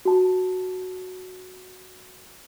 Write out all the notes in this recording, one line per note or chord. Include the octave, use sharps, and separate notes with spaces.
F#4 A5